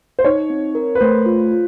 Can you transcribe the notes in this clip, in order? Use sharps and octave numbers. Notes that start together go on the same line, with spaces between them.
C5
D#4 C#5
C4
A#4
B4
A3 C5
F4
F4